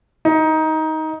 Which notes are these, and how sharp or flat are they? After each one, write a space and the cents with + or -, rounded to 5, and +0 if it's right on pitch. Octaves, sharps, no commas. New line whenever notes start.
D#4 +15